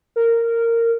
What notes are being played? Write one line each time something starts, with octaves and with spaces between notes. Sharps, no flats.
A#4